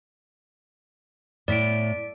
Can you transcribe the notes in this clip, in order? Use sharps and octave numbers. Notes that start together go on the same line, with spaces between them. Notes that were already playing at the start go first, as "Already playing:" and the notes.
A2 D5 B6 D7